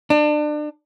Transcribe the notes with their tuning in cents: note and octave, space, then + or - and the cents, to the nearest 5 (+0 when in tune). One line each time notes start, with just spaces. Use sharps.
D4 +30